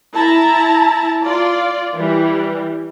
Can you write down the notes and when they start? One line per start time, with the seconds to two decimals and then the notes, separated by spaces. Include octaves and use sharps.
0.13 E4 A5 A#5
1.22 F4 D5
1.96 E3 G3